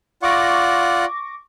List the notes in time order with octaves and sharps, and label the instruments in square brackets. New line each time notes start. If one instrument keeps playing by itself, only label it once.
[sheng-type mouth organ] F4 D5 F#5 [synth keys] C#6 D6 A#6